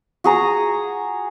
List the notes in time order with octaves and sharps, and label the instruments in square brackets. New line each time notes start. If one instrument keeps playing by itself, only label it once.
[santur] F#4 G#4 A#5